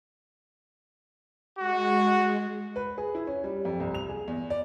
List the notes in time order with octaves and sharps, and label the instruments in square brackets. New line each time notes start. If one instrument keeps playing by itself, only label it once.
[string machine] G#3 [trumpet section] F#4
[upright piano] B4
G#4
E4
C#4
G3
F2
C2
F7
G#4
E2
D5